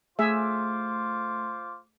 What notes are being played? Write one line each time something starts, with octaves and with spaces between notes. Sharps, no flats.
A3 F4 G#4 C5 E5 D6